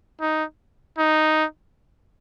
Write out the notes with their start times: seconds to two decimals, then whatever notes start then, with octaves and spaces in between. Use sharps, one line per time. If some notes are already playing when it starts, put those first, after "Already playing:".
0.21 D#4
0.98 D#4